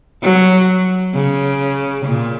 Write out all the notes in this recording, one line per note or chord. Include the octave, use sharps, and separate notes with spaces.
F#3
C#3
A#2